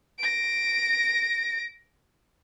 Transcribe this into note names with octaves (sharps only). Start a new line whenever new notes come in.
A#6 D7